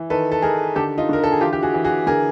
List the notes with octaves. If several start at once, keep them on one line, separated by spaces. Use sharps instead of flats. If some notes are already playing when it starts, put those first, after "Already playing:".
Already playing: E3
D#3 A4 B4
A4
D#3 G#4 A#4
D3 G4 A4
D#4 F4
D3 A#4
A4
G#4
E3 F4 G4
G4
F#4 G#4
E3
F#4 G#4
D3 G#4 A#4